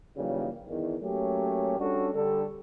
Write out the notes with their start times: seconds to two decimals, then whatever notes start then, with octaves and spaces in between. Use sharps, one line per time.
0.16 C#3 E3 F#3 G3 A#3 D#4
0.68 E2 D#3
1.02 F#3 A3 A#3 C#4 G4
1.80 G3 C#4 D4 F#4 A4
2.14 D3 G3 A4